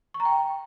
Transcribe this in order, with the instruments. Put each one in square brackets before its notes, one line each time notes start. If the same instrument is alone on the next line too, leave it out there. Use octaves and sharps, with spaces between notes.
[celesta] C#6
A#5
G5